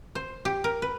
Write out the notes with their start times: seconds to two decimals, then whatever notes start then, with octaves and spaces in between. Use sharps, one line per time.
0.15 C5
0.45 G4
0.64 A#4
0.82 B4